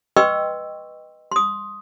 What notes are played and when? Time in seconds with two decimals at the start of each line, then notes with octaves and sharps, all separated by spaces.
0.16 B4 D#5 G5 C6 C#6 E6
1.32 C6 D#6